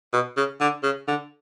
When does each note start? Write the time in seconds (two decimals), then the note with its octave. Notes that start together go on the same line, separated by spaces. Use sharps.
0.13 B2
0.37 C#3
0.61 D3
0.83 C#3
1.08 D3